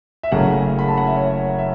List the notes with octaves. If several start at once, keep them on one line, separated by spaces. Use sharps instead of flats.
E5
F#1 F#2 C#3 F#3 A3 F#5
B5
A5
F#5
E5
C#5
E5